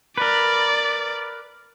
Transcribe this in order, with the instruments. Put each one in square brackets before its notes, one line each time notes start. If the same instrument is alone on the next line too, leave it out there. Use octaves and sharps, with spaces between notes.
[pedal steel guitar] A#4 B4 [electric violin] D5